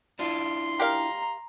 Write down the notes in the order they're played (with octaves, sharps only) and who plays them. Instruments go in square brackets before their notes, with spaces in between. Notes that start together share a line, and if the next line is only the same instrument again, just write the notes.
[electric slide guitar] D4 E4 F4 [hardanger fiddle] C6
[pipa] G4 A#4 F5 [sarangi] A#5